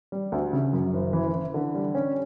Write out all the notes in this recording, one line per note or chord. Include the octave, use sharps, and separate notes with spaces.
G3
D2
C#3
F#2
F#1
E3
E3
D3
G3
C#4